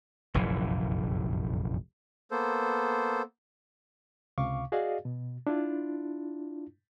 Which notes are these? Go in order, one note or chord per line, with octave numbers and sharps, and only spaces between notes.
F1 A#1 F#2 E3
A#3 B3 A4 C5
C#2 C3 F5 C#6 D6
F#4 G#4 D5 D#5 F5
B2
D4 E4 F4